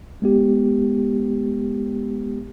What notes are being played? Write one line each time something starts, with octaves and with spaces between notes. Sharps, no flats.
G#3 B3 G4